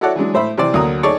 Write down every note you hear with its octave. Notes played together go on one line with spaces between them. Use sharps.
E4 F#4 A4 C#5 D5 F#5
E3 F#3 G#3 D4
A2 C5 E5 B5
C3 E3 C5 D5
D2 F#3 A#3 A#5 D#6
D#4 G#4 A4 C#5 D5 C#6